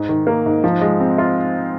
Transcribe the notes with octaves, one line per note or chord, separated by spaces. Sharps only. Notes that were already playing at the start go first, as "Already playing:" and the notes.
Already playing: G#2
D#3
A#3
G#2
F3
G#3
C4
F4